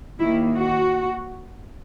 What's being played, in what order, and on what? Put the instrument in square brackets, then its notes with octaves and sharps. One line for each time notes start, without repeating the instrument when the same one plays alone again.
[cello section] D#2 D#3 A#3 E4
F#4